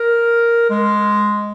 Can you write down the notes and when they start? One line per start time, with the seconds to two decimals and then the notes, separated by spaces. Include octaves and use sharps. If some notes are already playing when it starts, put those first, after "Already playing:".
Already playing: A#4
0.70 G#3